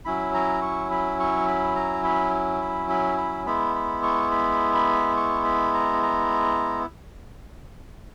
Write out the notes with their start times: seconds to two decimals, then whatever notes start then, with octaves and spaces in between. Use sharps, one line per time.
0.05 F#3 C#4 E4 B5
0.34 A#5
0.62 C#6
0.91 B5
1.20 C#6
1.48 B5
1.76 A#5
2.04 B5
2.62 B5
2.90 B5
3.18 B5
3.46 G#3 B3 E4 B5
3.75 B5
4.03 C#6
4.31 B5
4.75 B5
5.17 C#6
5.45 B5
5.74 A#5
6.03 A#5